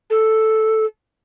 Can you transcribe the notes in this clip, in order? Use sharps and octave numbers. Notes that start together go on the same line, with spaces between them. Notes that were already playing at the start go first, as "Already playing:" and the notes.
A4